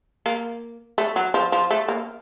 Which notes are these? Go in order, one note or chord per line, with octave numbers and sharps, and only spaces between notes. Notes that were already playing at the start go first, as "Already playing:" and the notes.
A#3
A3
F#3
F3
F3
A3
A#3